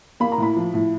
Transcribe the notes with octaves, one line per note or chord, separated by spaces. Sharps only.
A#3 B5
A#5
A2 B5
F3
A2